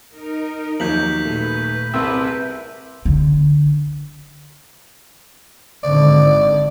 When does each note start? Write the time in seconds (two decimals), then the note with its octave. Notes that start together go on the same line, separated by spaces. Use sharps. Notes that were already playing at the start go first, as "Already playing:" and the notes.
0.15 D#4 A#4
0.80 D#2 F3 F#3 G6 B6 F#7
1.26 A#2 A3 B4
1.94 C2 C3 E4 G#4 A#4 B4 E5 A5
3.05 D3
5.83 G#1 D3 D5